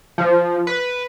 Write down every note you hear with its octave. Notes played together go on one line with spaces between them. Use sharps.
F3
B4